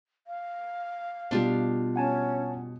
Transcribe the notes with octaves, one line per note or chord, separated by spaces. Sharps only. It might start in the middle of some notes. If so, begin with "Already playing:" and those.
F5
B2 G3 D4 F4 G4
C#4 F#5 G#5 A5